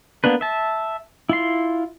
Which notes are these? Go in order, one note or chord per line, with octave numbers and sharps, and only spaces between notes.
A#3 B3 D4 B4
E5 A5
E4 F4 C6